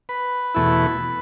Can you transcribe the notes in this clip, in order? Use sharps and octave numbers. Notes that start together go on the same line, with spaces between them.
B4
E2 B2 A3 E4